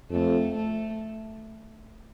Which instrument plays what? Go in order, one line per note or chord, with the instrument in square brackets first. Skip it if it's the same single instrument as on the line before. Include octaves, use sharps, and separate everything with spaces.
[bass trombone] F2 [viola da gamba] A3
[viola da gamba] A3